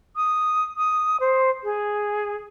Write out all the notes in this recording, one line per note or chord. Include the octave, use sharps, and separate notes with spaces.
D#6
D#6
C5
G#4